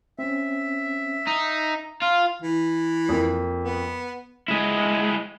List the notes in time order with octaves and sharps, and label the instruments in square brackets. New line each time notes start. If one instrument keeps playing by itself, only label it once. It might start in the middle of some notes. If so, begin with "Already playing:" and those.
[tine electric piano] C4 C#4 [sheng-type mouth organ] E5
[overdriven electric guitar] D#4 [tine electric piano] A#5
[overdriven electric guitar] F4 [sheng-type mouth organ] F5
[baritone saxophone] E3
[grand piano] F2 A#3
[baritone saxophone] B3
[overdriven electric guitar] G#3 E4